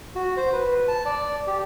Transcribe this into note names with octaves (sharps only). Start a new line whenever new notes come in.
F#4
C5
B4
A5
D5
G4